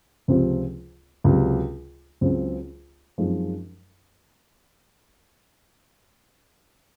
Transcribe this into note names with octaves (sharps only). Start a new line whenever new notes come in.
C#2 C3 F3 C4
C#2 C3 F#3
C#2 C#3 F#3 C4
F#2 F3 G#3 C4 D#4